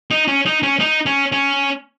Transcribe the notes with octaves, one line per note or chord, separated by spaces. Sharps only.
D#4
C#4
D#4
C#4
D#4
C#4
C#4